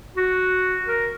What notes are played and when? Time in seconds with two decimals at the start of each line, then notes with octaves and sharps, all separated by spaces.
0.16 F#4
0.88 A#4